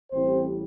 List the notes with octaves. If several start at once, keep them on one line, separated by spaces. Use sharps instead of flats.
A1 A2 G3 C4 C5